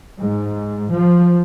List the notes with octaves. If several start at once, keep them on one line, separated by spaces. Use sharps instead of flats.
G#2
F3